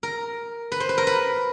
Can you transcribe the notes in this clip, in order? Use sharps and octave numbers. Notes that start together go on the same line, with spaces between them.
A#4
B4
C5
B4
A#4
B4